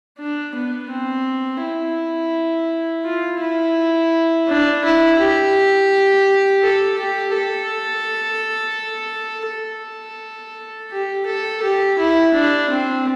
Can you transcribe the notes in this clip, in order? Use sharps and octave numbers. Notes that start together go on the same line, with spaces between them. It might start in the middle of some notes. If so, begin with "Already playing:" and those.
D4
B3
C4
E4
F4
E4
D4
E4
G4
A4
G4
A4
A4
G4
A4
G4
E4
D4
C4